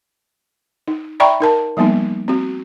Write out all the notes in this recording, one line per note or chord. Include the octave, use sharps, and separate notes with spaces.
D#4
D5 E5 G5 A#5 B5 C#6
D#4 A#4 A5
F3 G3 A#3 B3 D#4
C4 F#4